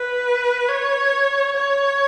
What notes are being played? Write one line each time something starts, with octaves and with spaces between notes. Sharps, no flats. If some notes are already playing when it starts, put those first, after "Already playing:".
Already playing: B4
C#5
C#5